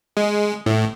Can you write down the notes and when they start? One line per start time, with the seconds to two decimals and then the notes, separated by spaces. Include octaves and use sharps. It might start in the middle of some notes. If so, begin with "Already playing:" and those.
0.17 G#3
0.66 A2